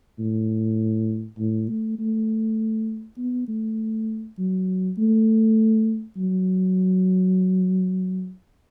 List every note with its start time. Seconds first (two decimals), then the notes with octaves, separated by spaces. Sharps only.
0.19 A2
1.39 A2
1.69 A3
1.99 A3
3.17 B3
3.48 A3
4.38 F#3
4.98 A3
6.17 F#3